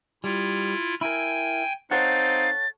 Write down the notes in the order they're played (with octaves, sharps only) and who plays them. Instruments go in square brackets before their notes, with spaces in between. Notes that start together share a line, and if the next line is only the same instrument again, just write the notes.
[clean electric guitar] G3 [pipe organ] E4 F4
[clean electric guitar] E4 A#4 [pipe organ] G5 G#5
[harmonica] C4 D#4 [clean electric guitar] A4 C#5 F#5 [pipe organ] F5 [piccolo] A6